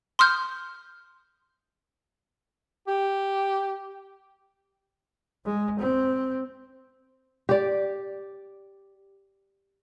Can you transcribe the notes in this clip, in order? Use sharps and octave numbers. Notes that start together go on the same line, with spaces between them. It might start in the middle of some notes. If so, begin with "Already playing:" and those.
C6 D#6 F6 G6
G4
G#3
C4
G4 D5